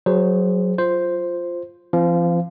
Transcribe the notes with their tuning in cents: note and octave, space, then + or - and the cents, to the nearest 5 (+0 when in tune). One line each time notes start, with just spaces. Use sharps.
F#3 +0 G#4 +0 C5 -20
F4 +0 C5 +0
F3 -35 C4 +0 F5 +0